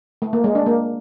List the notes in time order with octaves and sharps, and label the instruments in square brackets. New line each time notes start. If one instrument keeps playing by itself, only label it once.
[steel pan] A3
A#3
G#3
D4
A#3